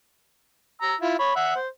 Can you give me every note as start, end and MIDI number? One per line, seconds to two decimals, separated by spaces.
0.82 0.95 82
0.82 0.95 88
1.01 1.14 64
1.01 1.14 65
1.19 1.32 73
1.19 1.32 83
1.36 1.55 76
1.36 1.55 78
1.56 1.68 72